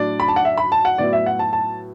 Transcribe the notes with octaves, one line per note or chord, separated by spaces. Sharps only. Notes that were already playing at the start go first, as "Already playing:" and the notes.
Already playing: A2 F#3 D4 D5
B5
A5
F#5
E5
B5
A5
F#5
A2 F#3 B3 E4 D5
E5
F#5
A5
A5